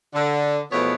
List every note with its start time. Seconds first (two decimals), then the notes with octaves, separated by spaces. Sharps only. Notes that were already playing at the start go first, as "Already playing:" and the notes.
0.14 D3
0.72 E2 B2 F3 A3 B3 C#5